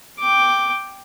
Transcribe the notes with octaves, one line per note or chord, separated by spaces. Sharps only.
G5 D6